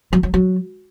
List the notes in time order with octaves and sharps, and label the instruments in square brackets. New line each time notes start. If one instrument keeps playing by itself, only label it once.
[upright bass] F#3
F#3
F#3